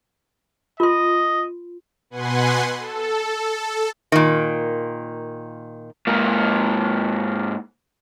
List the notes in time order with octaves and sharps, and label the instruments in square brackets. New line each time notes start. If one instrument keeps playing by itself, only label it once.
[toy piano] F4 C6 [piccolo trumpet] D#5
[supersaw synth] B2 B4 F#5 G#5 C6
A4
[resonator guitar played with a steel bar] A#2 D#3
[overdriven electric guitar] G#2 A#3